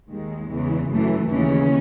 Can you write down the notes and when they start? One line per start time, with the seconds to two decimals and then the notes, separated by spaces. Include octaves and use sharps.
0.11 D#2 D#3 G#3
0.51 E2 C#3 E3
0.91 F#2 E3 A3
1.31 D#2 C#3 E3 C#4